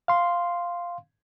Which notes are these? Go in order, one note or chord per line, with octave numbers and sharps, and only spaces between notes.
F5 C6